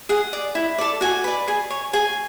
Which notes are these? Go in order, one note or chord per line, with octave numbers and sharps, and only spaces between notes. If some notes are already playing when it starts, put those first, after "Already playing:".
G#4 F#5
D5
E4
A4 D5
F#4 G#5
B4 D5
G#4 G#5
C#5
G#4 G#5